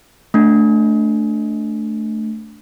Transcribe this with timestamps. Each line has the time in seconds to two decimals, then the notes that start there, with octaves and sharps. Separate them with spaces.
0.34 A3 D4